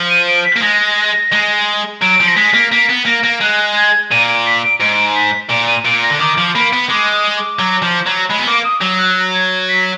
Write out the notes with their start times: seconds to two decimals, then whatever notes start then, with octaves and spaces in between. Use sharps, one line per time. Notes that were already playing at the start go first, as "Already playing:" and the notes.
Already playing: F3
0.10 D#7
0.28 D7
0.45 B6
0.57 A#3
0.62 G#3 A#6
1.32 G#3
2.01 F#3 D7
2.20 F3
2.28 A#6
2.36 G#3 B6
2.54 A#3
2.72 A#3 B6
2.90 B3
3.06 A#3 A#6
3.24 A#3
3.41 G#3 F#6
3.76 G#6
4.11 A#2 D#7
4.29 D7
4.46 B6
4.64 D7
4.81 G#2 D7
5.16 B6
5.50 A#2 D7
5.67 D#7
5.85 A#2 D7
6.03 A#6
6.10 D3
6.20 D#3 D6
6.38 F3
6.55 A#3 B5
6.73 B3
6.89 G#3 D6
7.13 D#6
7.37 D6
7.59 F#3
7.82 F3
8.06 F#3
8.29 G#3 B5
8.39 B3
8.47 A#3 D6
8.64 D#6
8.81 F#3
8.98 F#6
9.34 G#6
9.69 B6